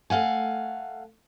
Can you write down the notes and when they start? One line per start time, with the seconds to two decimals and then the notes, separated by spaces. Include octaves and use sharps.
0.10 A3 F5 F#5 G#5